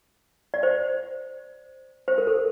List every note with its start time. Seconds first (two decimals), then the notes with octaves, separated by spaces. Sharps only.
0.54 D5
0.63 C5
2.08 C5
2.18 A#4
2.27 A4